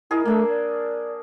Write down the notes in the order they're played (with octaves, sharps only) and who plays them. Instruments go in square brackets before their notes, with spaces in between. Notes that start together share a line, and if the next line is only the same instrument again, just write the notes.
[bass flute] E4 [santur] G#4 A#4 D#5
[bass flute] A3 [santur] A#3 D4 E6
[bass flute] D5